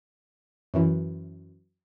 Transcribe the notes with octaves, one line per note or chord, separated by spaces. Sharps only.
F#2 E3